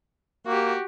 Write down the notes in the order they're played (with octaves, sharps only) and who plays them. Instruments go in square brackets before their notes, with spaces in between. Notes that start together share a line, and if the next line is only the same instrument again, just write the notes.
[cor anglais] A#3 [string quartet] F#4 G4